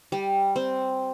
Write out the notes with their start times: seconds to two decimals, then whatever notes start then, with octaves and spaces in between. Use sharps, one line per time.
0.12 G3
0.56 C4